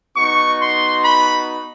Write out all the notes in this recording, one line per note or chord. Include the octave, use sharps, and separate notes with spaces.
B3 D#4 F#4 C#6
C6
B5